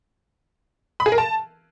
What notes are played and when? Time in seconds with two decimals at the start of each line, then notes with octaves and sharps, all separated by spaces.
1.00 B5
1.06 G#4
1.12 A#4
1.18 A5